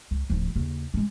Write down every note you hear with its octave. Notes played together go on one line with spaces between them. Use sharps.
C#2
D1 F3
D#2 C#3
G#3 C#4